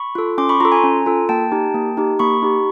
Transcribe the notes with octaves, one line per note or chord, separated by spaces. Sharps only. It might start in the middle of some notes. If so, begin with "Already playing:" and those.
Already playing: B5 C#6
F4 A4
C#4 C6 D6
B5 C#6
F4 A4 A#5 C6
G#5 A#5
C#4
F4 A4
A#3 G5 A5
D#4 G4
A#3
D#4 G4
A#3 B5 C#6
D#4 G4